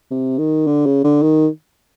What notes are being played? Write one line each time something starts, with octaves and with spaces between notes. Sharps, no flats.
C3
D#3
D3
C#3
D3
D#3